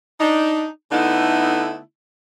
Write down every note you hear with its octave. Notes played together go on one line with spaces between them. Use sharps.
D4 D#4
D3 A3 B3 D#4 E4